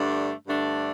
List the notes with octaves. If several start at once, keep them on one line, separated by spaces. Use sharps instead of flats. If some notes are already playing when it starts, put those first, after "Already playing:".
Already playing: G2 D3 A3 D4
G2 D3 A3 D4